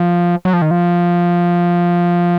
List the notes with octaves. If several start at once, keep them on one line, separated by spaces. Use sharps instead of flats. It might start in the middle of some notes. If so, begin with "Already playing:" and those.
Already playing: F3
F#3
F3
D#3
F3